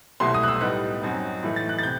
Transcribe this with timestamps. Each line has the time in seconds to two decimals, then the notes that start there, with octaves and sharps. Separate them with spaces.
0.20 C2 B2 F#3 A3 E4 C6
0.34 D#6
0.43 F#6
0.48 E6
0.61 A2 G3 B3 D#4 F#6
1.02 F#2 F#3 C4 D#4
1.43 A2 E3 A3 D#4
1.56 A6
1.69 F#6
1.79 A6
1.83 C3 G6